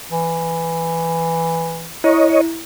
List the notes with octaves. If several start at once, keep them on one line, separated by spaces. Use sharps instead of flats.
E3
E4 C#5 D#5